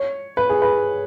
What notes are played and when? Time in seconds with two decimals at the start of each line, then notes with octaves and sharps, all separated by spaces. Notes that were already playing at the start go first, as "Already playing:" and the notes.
Already playing: C#5
0.37 B4
0.49 G#4
0.62 B4